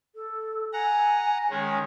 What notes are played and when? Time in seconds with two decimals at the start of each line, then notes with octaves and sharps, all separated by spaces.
0.15 A4
0.73 F#5 G#5 A#5
1.50 D#3 G#3 C#4